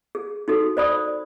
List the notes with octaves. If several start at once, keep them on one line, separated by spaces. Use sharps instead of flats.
G#4
D#4 F#4 A4
C5 D5 B5 D#6